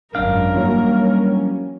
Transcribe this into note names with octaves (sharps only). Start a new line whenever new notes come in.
G#1 F#2 D4 A#4 F5
E3 F#3 G3 A#3 C#4